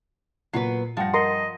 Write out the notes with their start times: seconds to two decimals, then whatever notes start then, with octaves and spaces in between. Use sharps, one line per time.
0.53 A#2 F#3 B3 B4 C7
0.97 G2 F3 F#5 G5 A#6
1.14 A#4 D#5 A#5 C6